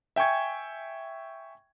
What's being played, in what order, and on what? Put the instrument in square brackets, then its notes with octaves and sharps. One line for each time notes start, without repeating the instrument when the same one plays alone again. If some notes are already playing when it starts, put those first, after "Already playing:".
[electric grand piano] E5 G5 G#5 C#6 G#6